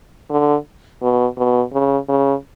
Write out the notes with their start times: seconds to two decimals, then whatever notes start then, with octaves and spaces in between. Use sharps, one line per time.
0.30 D3
1.02 B2
1.38 B2
1.73 C#3
2.09 C#3